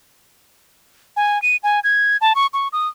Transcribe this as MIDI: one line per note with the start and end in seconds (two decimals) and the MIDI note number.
1.16 1.41 80
1.42 1.56 99
1.63 1.80 80
1.84 2.17 92
2.21 2.33 81
2.35 2.47 85
2.53 2.68 85
2.73 2.88 87